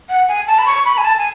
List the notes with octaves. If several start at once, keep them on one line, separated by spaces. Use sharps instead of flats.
F#5
G#5
A5
B5
C#6
B5
G#5
A5
G#5